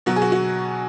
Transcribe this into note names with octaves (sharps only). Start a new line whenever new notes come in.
B2 F#3 F#4
G#4
F#4
F#4